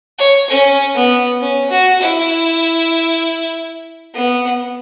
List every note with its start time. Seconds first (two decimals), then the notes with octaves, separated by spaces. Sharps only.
0.19 C#5
0.50 C#4
0.95 B3
1.41 C#4
1.71 F#4
2.01 E4
4.15 B3